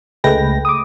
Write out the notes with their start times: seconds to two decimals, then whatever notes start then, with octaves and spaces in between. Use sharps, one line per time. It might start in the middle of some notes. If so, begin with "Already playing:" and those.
0.24 C#2 G#3 A3 B4 G5 A#6
0.65 D6 D#6